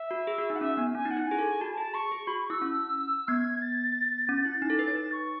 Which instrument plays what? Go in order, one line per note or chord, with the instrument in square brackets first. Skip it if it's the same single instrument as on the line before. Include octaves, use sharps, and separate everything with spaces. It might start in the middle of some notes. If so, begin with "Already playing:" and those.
Already playing: [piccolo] E5
[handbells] F#4
G#4
F#4
D#4
[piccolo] F#5
[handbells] C#4 [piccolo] E5
[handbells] B3 [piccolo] G#5
[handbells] C#4 [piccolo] G#5
[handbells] D#4
[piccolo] F#5
[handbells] E4
[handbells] G#4 [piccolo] G#5
[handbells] A4
A4
[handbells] F#4 [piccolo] A5
[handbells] G#4 [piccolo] A5
[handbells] G#4 [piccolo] C#6
[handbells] G#4
[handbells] F#4 [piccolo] B5
[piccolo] C#6
[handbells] E4 [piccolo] E6
[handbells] C#4
[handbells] B3 [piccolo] G#6
[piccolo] A6
[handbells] C#4
E4
D#4
A4
B4
C#5
[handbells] D#4 [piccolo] A6
[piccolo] C#6